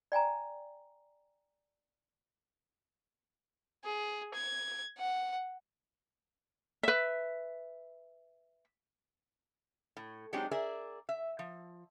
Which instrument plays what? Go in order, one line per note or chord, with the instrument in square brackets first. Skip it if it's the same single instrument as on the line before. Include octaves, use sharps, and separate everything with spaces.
[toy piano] D5 G5 G#5 A#5
[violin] G#4
G#6
F#5
[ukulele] B4 E5
[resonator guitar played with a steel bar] A2
F#3 G#3 C4 D4 D#4 G4
G#4 A#4 D5 E5
E5
F3